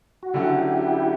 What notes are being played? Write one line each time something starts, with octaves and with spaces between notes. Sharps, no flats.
F#4
D3 F#3 C#4 E4 F#4 G4